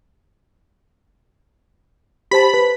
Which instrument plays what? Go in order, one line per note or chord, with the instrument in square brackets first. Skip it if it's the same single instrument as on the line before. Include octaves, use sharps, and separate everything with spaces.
[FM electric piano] G4 C5 A5 [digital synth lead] B5
[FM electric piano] B4